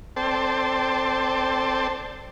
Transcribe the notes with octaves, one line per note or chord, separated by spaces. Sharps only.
C4 A4 C5 D5 G5 A5